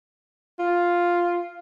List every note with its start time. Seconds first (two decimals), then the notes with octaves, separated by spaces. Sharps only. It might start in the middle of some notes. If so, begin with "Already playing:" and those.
0.59 F4